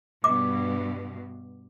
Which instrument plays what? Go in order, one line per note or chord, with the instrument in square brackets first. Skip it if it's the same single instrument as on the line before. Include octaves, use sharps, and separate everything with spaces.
[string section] G2 B2 [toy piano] D6